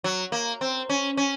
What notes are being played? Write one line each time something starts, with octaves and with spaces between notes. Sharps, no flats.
F#3
A#3
C4
C#4
C#4